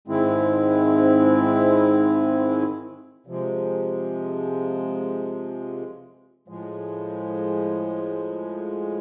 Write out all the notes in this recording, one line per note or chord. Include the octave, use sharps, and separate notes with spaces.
G#2 D#3 G#3 C4 E4
C3 F3 G#3
A2 F3 G#3